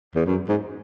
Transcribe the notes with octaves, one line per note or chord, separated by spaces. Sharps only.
E2
F#2
G#2